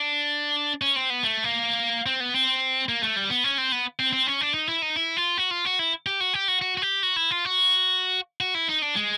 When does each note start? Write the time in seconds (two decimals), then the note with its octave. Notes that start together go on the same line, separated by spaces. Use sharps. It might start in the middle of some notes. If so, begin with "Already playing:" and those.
Already playing: D4
0.82 C#4
0.96 C4
1.10 B3
1.23 A3
1.44 A#3
2.06 C4
2.20 B3
2.34 C4
2.89 A#3
3.03 A3
3.16 G3
3.30 B3
3.44 C#4
3.58 C4
3.72 B3
3.99 C4
4.13 C4
4.27 C#4
4.41 D4
4.54 D#4
4.68 E4
4.82 D#4
4.96 E4
5.17 F4
5.38 F#4
5.51 F4
5.65 F#4
5.79 E4
6.06 G4
6.20 F#4
6.34 G4
6.48 F#4
6.62 F#4
6.77 F#4
6.82 G4
7.03 F#4
7.16 E4
7.31 F4
7.45 F#4
8.40 F#4
8.55 E4
8.69 D#4
8.82 D4
8.96 G#3